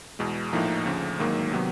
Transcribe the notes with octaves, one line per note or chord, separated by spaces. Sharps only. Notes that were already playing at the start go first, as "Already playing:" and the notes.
E2 B2 G#3
A#1 A2 F3 A#3 D#4
D2 C#3 F3
A1 G#2 D#3 F#3 A#3
C3 D#3 F#3 B3